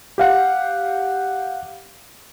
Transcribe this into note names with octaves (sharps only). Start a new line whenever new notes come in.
G4 F5 F#5